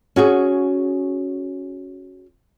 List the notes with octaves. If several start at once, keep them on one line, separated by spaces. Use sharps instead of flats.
C#4 F#4 G#4